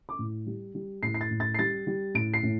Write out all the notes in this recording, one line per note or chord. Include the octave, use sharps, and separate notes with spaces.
D6
A2
G3
G3
A2 C7
C7
A6
A2
A6
C7
G3 A6
G3
A2 D7
C7
A2